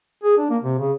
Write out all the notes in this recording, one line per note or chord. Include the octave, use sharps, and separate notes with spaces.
G#4
D4
A#3
C3
C#3